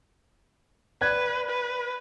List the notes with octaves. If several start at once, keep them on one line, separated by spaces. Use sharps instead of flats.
B4 D5 F#6 G#6
B4